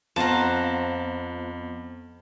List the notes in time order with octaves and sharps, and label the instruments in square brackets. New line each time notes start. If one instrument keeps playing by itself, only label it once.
[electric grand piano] F2 [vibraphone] B3 [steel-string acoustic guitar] F4 C5 F#5 [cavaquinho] A5 A#5